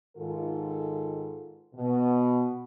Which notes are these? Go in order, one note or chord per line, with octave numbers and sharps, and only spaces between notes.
G#2 D#3 F4 A4
B2